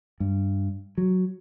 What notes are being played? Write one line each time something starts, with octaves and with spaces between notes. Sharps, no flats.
G2
F#3